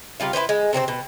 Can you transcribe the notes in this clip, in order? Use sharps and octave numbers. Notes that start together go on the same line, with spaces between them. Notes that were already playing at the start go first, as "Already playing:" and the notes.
C3 G3 F4 F5
E4 G#4 B4 C5
G#3
C3 C4 D4 C5
B2